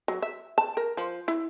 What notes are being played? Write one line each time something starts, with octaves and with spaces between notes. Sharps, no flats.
F#3
E5
A5
A#4
F3
E4